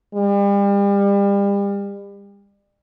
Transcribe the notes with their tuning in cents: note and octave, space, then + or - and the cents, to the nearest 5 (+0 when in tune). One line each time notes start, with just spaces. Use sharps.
G3 +35